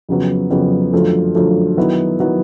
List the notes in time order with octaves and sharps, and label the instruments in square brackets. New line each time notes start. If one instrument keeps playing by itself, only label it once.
[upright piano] F2 C#3 F#3 B3
F2 C#3 F#3 B3
F#2 D3 F3 A3
F#2 D3 F3 A3
D#3 F#3 B3 E4
D#3 F#3 B3 E4